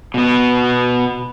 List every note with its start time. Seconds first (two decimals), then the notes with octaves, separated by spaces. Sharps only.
0.14 B2 B3